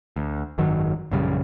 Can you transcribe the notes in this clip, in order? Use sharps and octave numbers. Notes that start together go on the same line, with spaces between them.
D2
G#1 F#2 D#3 F#3
A#1 F#2 C#3 G3